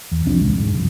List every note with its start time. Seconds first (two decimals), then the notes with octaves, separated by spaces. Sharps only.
0.12 E2
0.26 C2 F3 C4 D4
0.39 D#1 C#2 G#3
0.53 F1 G#2
0.72 F#1 C2 F2